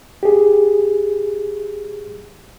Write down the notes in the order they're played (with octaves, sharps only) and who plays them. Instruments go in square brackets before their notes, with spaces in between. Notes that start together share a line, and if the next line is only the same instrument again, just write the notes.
[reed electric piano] G4 G#4